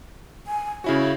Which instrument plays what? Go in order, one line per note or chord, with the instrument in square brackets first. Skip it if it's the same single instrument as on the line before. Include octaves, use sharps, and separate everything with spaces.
[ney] G#5
[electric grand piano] C#3 E4 F#4 [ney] C#5